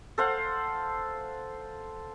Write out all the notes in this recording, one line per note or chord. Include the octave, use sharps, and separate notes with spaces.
A4 C5 F5 F#5